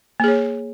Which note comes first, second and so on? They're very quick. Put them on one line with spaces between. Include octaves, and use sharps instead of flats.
A#3 G#4 C#5